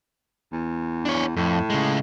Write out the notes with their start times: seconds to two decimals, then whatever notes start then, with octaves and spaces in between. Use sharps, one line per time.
0.52 E2
1.05 D4 C#5
1.36 F2 A2
1.70 C#3 G#3